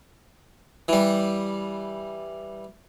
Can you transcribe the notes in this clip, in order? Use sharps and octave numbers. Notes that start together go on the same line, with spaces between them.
E3 G3